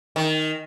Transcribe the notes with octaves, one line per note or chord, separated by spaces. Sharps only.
D#3